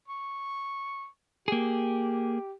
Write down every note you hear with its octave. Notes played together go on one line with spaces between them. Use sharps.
C#6
A#3 G4 G#4